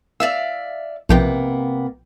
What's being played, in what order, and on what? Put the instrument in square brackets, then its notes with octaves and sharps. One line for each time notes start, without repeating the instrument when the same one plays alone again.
[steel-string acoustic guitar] D5 E5 F5 [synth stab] E6
[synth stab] B1 F3 G5 [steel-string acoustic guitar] C3 A#3 B3